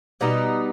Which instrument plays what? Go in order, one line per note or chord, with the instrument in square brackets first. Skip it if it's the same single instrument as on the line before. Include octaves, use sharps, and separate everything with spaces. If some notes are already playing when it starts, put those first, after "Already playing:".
[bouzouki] B2 G3 B3 D#4